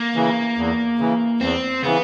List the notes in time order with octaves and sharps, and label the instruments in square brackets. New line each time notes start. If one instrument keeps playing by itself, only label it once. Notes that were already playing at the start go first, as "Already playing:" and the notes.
Already playing: [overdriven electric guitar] A#3
[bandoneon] C#3 E3
E2
C#3 E3
[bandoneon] E2 [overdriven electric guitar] C4
[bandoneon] C#3 E3 [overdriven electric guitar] B3